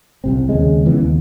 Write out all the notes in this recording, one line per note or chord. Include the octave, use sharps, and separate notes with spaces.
C2 C3 C4
D#2 C#3 G#3
C#3 E3 B3
D#2